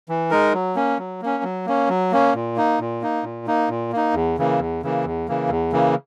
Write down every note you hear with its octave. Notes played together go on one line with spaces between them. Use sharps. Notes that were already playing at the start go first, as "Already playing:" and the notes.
E3
G#3 D#4 A#4
F#3
A#3 C#4
F#3
A#3 C#4
F#3
A#3 C#4
F#3
A#3 C#4
A#2
A#3 D#4
A#2
A#3 D#4
A#2
A#3 D#4
A#2
A#3 D#4
E2
C#3 E3 A#3
E2
C#3 E3 A#3
E2
C#3 E3 A#3
E2
C#3 E3 A#3